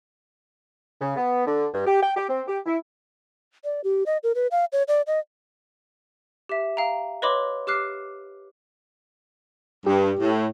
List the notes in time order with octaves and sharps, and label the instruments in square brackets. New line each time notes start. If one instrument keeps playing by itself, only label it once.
[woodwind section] C#3
B3
D3
G2
G4
G5
G4
C4
G4
E4
[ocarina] D5
G4
D#5
A#4
B4
F5
C#5
D5
D#5
[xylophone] G4 E5
F5 G5 A#5
B4 C#5 D#5 B5 C6 D6
G4 D6 F6 F#6 C7
[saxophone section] G2 [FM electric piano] G4
[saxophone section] A2